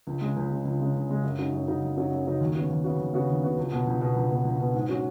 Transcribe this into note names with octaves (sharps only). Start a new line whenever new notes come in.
C#2
C#3 G#3
C#2
C#3 G#3
C#2
C#3 G#3
C#2
C#3 G#3
F#2
C#3 F#3 D#4
F#2
C#3 F#3 D#4
F#2
C#3 F#3 D#4
F#2
C#3 F#3 D#4
D#2
C#3 B3 F#4
D#2
C#3 B3 F#4
D#2
C#3 B3 F#4
D#2
C#3 B3 F#4
C#2
B2 B3
C#2
B2 B3
C#2
B2 B3
C#2
B2 B3
G#2
F#3 C#4 F#4